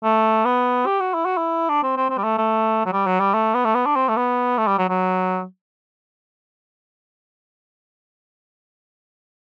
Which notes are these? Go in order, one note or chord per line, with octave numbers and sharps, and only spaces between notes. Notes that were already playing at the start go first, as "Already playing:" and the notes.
A3
B3
G4
F#4
E4
F#4
E4
D4
C4
C4
C4
G3
A3
A3
F#3
G3
F#3
G3
A3
B3
A3
B3
D4
C4
A3
B3
A3
G3
F#3
F#3